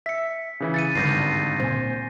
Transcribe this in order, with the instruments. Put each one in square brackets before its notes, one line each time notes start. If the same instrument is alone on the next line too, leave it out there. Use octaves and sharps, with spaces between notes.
[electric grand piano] E5 [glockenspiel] B6 C#7
[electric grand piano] C#3 E3 E4
[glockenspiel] A6 C#7 D#7
[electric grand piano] G#1 G2 [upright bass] D3 E4 [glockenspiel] G6 A#6 C7
[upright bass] A#2 C4 [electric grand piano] C5 G#5